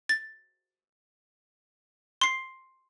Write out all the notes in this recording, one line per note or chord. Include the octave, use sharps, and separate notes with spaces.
A6
C6 C7